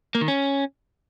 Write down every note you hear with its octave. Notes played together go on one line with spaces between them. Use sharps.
A#3
D#3
C#4